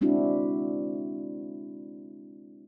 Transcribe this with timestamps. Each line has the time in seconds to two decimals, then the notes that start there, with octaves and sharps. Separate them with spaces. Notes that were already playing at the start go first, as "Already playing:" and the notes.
0.01 G#3 C4 D4 E4 F#4